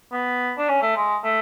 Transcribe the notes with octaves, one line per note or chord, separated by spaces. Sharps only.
B3
D4
C#4
A3
G#3
A3